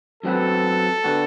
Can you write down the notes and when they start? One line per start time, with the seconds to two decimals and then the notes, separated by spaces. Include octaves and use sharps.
0.23 F#2 F#3 C4 F#4 A4 B4
1.04 D3 G3 B3 F#4